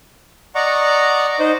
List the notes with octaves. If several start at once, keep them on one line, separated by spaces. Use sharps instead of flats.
D5 D#5 F#5 A#5 C#6 D6
D#4 C5 D#5